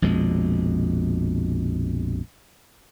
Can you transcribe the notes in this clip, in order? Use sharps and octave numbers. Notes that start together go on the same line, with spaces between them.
A#1 F2 B2 G#3